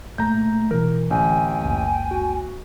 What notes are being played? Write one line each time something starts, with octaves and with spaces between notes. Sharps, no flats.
A#2 A3 A#5 G6
B2 E3 E4 A#4
A1 D3 C4 G5 G#5
F#1 C#2
F#4